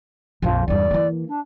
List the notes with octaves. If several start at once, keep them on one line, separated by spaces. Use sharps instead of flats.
A#1 F2 F3
E2 G2 D5
E3 A#3
D4